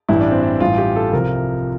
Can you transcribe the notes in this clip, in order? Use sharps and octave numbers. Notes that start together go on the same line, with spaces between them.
A1 G2 E3 G3 E4
D4
C4
D4
A1 G2 E3 G3 F4
G4
A4
C2 C3 F3 A#4